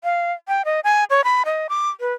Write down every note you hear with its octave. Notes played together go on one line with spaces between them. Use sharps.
F5
G5
D#5
G#5
C#5
B5
D#5
D6
B4